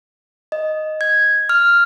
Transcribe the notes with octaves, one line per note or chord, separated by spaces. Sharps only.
D#5
G#6
F6